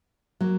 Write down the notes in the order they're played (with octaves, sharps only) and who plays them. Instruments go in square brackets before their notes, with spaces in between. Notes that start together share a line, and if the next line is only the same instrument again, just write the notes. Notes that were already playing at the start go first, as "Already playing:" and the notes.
[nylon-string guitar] F#3 A#3